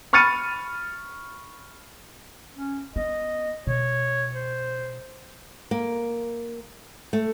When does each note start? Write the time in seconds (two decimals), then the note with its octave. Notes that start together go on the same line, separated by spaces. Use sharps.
0.13 B5 C#6 F6 A6 C#7 D#7
2.54 C#4
2.96 B3 D#5
3.67 B2 C#5
4.34 C5
5.71 A#3
7.13 A3